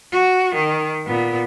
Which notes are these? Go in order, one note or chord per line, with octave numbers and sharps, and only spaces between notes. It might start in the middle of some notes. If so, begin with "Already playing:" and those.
F#4
D#3
A#2 B3